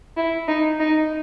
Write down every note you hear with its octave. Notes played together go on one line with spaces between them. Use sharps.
E4
D#4
D#4